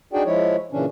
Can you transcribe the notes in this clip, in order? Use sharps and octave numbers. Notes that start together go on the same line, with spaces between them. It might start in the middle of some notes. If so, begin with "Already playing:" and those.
D4 D#4 F#4 G#4 D5 G5
F3 G#3 E4 C#5
A#2 C#3 E3 C#4 D4